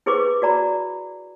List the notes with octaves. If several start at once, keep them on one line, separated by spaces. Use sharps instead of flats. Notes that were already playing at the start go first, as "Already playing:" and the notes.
E4 G#4 B4 C5 C#6 D6
F#4 D5 A#5 B5